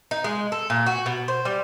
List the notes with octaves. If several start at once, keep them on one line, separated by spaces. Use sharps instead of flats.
D#4
G#3
A4
A#2
F#4
B2
C5
G3